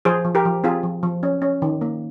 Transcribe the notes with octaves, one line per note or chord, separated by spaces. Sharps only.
F3 G#4 C5
F3
G4 A#4
F3
C4 F4 G#4
F3
F3
C#4
C#4
D#3
A#3